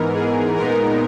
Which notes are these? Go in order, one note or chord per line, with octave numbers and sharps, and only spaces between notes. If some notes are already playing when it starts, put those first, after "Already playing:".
Already playing: G#2 E3 B3 D#4 A#4
G#4
A#2 G#3 B3 D#4 A#4